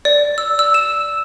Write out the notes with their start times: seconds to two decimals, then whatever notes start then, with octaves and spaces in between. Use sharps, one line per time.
0.05 D5
0.38 E6
0.59 E6
0.74 E7